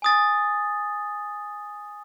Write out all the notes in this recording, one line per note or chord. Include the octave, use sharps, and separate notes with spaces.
G#5 D#6 A6